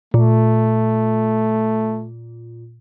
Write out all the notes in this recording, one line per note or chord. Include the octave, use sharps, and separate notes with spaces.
A#2 A3